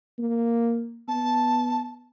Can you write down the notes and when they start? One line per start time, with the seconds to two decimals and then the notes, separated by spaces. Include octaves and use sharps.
0.19 A#3
1.08 B3 A5